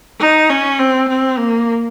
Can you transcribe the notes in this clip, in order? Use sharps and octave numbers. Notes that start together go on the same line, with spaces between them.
D#4
C#4
C4
C4
A#3